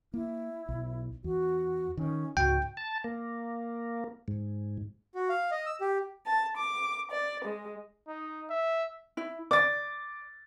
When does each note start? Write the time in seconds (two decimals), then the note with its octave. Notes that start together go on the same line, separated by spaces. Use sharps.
0.14 A#3 E4
0.69 B1
1.24 E2 F#4
1.97 D#3 C#4
2.37 C#2 G#2 F#4 G5
2.77 A5
3.04 A#3
4.28 G#2
5.15 F#4
5.29 F5
5.51 D#5
5.66 E6
5.81 G4
6.26 A5
6.56 D6
7.11 D5
7.44 G#3
8.08 D#4
8.50 E5
9.17 E4
9.51 D5 D6 A6